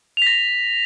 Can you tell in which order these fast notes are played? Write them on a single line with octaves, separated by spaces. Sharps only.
F7 B6 A#6